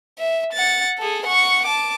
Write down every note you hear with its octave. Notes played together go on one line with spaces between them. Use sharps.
E5
F#5 A6
G#4 A4
F#5 C#6
A5 D6